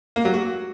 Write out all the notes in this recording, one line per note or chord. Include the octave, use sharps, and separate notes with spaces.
A#3
F#3
F#4